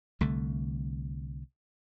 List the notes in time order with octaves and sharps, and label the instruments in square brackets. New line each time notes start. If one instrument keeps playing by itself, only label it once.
[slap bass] C2 D3 A3